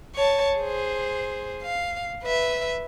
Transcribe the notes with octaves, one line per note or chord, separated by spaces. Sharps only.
C#5 A5
G#4 C5
F5
B4 E5